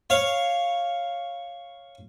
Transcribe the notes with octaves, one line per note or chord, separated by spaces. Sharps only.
C#5 F5